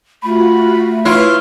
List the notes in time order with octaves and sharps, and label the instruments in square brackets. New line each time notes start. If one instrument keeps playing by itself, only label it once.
[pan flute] A3 [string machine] F4 F#4 [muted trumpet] B5
[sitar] E4 F4 [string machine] B4 [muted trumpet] C#5